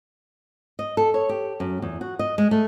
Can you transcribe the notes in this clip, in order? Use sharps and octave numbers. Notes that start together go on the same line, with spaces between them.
D#5
A4
C#5
G4
F#2
E2
F#4
D#5
G#3
A3